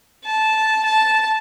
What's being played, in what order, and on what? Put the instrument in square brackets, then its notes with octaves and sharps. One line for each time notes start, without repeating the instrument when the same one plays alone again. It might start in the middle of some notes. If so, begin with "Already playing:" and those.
[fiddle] A5
A5